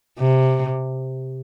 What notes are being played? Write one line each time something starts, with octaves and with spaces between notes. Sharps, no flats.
C3